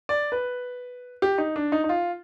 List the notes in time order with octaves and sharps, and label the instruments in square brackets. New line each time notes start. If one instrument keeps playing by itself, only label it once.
[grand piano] D5
B4
G4
D#4
D4
D#4
D#4
F4